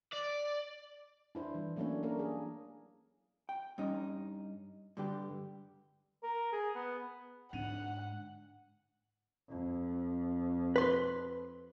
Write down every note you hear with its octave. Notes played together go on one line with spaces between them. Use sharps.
D5
D4 E4 C5
E3 G3
F#3 A3 A#3 C#4 D4 C#5
A#3 C#4 D4 A#4
G#4
G5
G2 C#4 D#4
G2 D3 G4
A#4
G#4
B3
G#2 D3 F#5 D#7 F7
F2
B4 C6